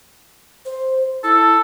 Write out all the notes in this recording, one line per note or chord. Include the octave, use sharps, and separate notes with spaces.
C5
E4 A4